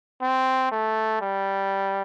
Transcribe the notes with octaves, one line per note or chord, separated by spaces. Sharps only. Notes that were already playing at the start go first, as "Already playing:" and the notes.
C4
A3
G3